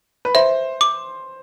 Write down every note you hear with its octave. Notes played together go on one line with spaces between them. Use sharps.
B4
C5 E5
D6